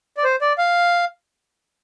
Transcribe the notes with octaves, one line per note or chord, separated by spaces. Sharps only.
D5
C5
D5
F5